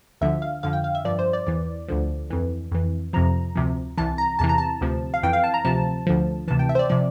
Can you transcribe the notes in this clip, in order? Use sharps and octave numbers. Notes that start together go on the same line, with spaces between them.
D2 D3 F3 E5
F5
F2 D3 F3 F5
G5
F5
E5
G2 F3 D5
C5
D5
E2 E3 D5
D2 D3 F3
F2 E3
F2 E3
F2 C3 F3 A#5
D2 C3 F3
C2 C3 E3 A5
A#5
E2 C3 E3 A5
A#5
A5
D2 C3 F3
F5
F2 E3 G5
F5
A5
A#5
D2 C3 F3 A5
D2 D3 F3
D2 C3 E3 A5
G5
E5
C5
D5
C3 F3 D5